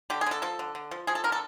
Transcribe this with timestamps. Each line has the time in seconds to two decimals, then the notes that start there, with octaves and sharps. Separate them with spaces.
0.10 D3 G4
0.21 G#4
0.26 D3 A4
0.42 F3 A4
0.59 D3
0.75 D3
0.91 F3
1.07 F3 G#4
1.15 A4
1.24 D3 A#4
1.32 A4